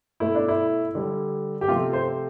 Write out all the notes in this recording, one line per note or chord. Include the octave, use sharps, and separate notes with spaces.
B2 A3 E4
D4
E4
D3 G3
G4
C3 F3 A3 F4
C5